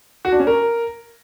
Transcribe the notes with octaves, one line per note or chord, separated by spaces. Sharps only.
F#4
D4
C#4
A#4